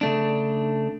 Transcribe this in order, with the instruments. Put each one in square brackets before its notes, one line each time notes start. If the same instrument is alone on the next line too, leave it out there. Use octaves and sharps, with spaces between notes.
[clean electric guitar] C#3 A3 D4